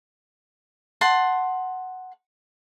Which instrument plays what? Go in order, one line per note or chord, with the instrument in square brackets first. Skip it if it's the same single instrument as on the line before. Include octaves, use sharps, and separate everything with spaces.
[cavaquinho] F#5 A5 C6